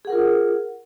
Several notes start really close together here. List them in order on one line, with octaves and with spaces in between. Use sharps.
G#4 F#5 A#4 F4